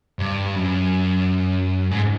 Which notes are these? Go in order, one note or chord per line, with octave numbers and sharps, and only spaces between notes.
G2
F#2
G#2